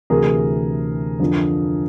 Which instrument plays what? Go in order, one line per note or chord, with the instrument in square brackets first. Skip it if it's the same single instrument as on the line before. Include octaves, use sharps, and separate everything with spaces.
[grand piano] D2 C3 E3 G#4 A#4
F2 D3 F3